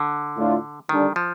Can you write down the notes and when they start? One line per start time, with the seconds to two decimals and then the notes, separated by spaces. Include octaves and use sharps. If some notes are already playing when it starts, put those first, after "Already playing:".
Already playing: D3
0.38 A2 A3 D4 F4
0.89 D3 D#3 G3 D4
1.16 F3